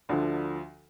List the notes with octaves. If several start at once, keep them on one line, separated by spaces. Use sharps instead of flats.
D2 D3 F3